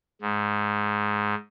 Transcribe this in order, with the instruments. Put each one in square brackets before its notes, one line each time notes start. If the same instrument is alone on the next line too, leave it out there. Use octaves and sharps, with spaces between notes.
[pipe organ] G#2